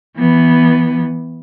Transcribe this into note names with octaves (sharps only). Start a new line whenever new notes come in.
E3 B3